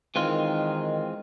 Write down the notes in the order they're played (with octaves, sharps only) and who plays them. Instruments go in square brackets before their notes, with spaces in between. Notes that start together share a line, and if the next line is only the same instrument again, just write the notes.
[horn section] D#3 [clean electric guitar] E3 G#3 C4 F4